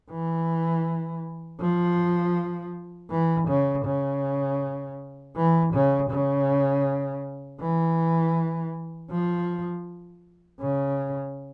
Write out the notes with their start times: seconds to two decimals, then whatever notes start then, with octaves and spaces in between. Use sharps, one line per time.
0.11 E3
1.60 F3
3.11 E3
3.48 C#3
3.86 C#3
5.36 E3
5.73 C#3
6.10 C#3
7.61 E3
9.10 F3
10.60 C#3